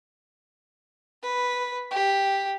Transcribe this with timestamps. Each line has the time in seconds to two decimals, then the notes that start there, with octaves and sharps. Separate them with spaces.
1.23 B4
1.91 G4